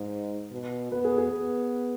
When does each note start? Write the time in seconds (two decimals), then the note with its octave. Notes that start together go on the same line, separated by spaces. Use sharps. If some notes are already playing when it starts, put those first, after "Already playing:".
Already playing: G#2 D#5
0.51 B2
0.92 B3 B4
1.05 G#4
1.18 G#4
1.31 B3